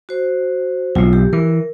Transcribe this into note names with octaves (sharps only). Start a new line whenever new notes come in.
F#4 C5
B1 A2 F4
G4
E3 A#4